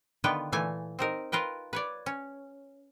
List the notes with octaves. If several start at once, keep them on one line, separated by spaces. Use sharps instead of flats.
D3 D#3 B3 F4 B4 G5
A#2 E3 A3 G#5
C4 D#4 A#4
F4 A#4 B4 G5
B4 C#5 D5
C#4